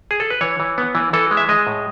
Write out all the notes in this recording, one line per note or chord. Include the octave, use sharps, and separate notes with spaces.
G#4
A4
B4
E3 C#5
E3
B3
E3
E3 A4
G#3
E5
G#3 D#5
A2